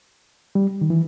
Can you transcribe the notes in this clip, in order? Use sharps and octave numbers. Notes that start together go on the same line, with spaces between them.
G3
D#3
E3